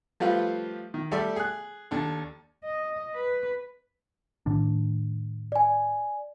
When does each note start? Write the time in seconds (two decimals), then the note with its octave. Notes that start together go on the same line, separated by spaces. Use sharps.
0.20 F3 G3 A3 F4 B4
0.94 D#3
1.11 G3 A3 A4 D5 E5
1.36 G#4 F#6
1.91 D#2 D4 A4
2.64 D#5
3.15 B4
4.46 A2 D#3 D4
5.52 D5 G#5